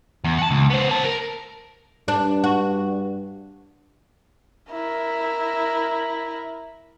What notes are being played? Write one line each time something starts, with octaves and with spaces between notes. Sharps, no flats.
E2
F#5 A5
C#2
B3 C5
A#3 A5
A#4
G2 D4
F#4
E4 A#4